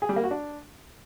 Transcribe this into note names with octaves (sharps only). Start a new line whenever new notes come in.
G#4
G3
A#3
F#4
D4